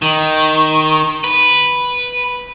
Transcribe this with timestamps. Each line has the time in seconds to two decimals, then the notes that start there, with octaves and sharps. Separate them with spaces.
0.02 D#3
1.24 B4